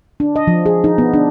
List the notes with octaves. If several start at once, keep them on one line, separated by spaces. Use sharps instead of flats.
D4
D#5
F3
G#4
D#4
B3
D4